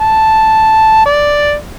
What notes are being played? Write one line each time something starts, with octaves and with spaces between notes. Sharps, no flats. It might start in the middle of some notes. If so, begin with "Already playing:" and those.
A5
D5